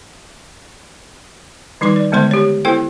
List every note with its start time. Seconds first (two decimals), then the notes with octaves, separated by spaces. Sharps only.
1.81 D#3 G3 D#4 C6 D6
1.96 D5
2.12 D3 G#3 B3 C5 C6
2.31 G4 C#5
2.65 B3 E4 A4 C5 G5